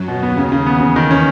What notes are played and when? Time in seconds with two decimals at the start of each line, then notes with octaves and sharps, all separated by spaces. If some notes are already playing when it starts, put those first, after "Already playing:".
Already playing: F#2 F#3
0.08 D#2 B2 D#3
0.23 B3
0.37 C#3
0.52 C#3
0.66 E2 E3 B3
0.81 C#3
0.96 D#3
1.11 C#4